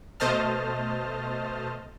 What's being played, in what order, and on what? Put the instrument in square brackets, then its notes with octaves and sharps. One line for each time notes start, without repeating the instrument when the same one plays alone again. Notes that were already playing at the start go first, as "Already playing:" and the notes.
[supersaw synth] B2 A3 C5 D#5 A5 F6